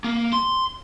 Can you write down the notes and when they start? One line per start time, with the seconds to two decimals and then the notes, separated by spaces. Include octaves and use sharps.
0.04 A#3
0.33 C6